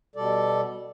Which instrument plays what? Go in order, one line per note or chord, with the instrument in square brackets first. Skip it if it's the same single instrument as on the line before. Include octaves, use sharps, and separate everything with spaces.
[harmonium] B2 G3 A4 D5